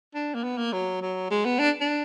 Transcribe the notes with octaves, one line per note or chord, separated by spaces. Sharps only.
D4
A#3
B3
A#3
F#3
F#3
G#3
B3
D4
D4